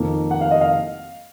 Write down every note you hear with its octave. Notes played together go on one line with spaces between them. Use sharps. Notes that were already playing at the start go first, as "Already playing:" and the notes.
Already playing: F2 D#3 A#3
F#5
F5
D#5
F5